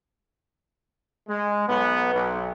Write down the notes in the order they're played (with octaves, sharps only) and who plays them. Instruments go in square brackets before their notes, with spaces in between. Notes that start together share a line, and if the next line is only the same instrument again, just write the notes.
[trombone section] G#3
B1 B3
B1